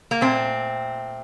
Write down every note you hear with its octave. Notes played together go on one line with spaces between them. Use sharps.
A#3
A#2 A3 C4